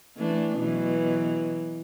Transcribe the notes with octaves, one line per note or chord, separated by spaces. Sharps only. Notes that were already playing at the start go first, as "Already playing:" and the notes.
E3 A3 D4
B2 E3 F#3